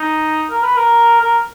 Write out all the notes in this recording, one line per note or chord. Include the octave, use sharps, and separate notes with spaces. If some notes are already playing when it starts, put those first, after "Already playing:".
Already playing: D#4
A#4
B4
A#4
A#4